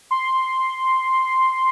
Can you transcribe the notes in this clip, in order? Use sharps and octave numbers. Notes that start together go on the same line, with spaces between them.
C6